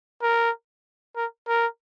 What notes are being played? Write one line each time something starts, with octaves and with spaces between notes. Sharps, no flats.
A#4
A#4
A#4